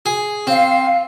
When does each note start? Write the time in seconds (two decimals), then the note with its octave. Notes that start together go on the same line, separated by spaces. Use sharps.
0.06 G#4
0.47 C4 F5